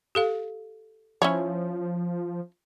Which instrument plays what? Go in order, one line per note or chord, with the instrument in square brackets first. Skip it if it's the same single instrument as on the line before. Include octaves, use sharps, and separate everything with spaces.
[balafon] G4 A4 F5
[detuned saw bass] F3 [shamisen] C#4 E4 C#5